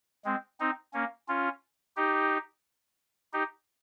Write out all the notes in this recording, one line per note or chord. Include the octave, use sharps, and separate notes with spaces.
G#3 C4
C4 D#4
A#3 C#4
C#4 F4
D#4 G4
D#4 G4